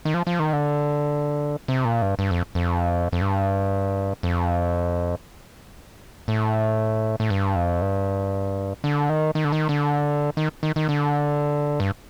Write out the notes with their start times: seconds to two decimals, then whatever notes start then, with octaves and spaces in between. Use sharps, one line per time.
0.05 D#3
0.14 F3
0.27 F3
0.39 D#3
0.53 D3
1.68 C3
1.85 A#2
2.02 G2
2.19 G2
2.31 F2
2.55 F2
3.12 F2
3.21 G2
4.23 F2
6.28 A2
7.20 A2
7.30 G2
7.56 F2
7.82 G2
8.84 D3
9.09 D#3
9.35 D#3
9.45 D3
9.52 D#3
9.69 D3
10.37 D#3
10.63 D#3
10.76 D#3
10.89 D3
11.80 G2